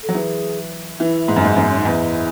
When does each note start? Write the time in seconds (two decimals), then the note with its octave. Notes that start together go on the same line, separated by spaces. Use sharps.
0.03 A4
0.09 F#3
0.14 E3 G#4
0.99 E3 E4
1.28 G#2
1.36 F#2 E4
1.42 G#2 D#4
1.56 F#2 A3
1.63 B3
1.70 C#4
1.78 D#4
1.85 E2 E4